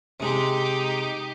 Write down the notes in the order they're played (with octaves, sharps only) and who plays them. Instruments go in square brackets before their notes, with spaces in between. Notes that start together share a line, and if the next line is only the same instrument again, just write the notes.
[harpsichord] C3 G#3 [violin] D#4 G4